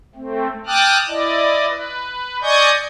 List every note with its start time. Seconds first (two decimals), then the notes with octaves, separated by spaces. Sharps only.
0.15 A3 C4
0.66 G5 A5 D6 D#6 F6 F#6
1.08 E4 D5 D#5
1.69 B4
2.42 D5 D#5 G#5 C#6 D#6 G6